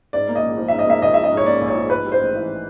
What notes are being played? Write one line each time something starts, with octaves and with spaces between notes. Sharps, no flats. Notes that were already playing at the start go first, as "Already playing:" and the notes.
G#2 D5
A#3
D#5
A#1
F3
G#2 E5
D#5
A#3 E5
A#1 D#5
F3 E5
D#5
G#2
C#5
A#3 D5
A#1
C#5
F3
G#2 B4
G3
C5
A1
E3